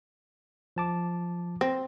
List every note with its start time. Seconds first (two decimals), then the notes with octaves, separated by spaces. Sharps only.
0.76 F3 A5 D6
1.61 C4 A#6